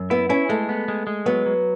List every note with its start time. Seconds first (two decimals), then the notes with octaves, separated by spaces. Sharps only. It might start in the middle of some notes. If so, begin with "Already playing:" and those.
Already playing: F#2
0.10 B3 E4
0.29 C#4 E4
0.49 G#3 A3
0.69 B3
0.88 G#3
1.07 G#3
1.26 F#3 B3
1.46 F#3